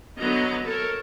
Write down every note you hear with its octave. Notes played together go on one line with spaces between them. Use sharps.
D3 F#3 B3 D#5 A#5
A4 A#4 C#5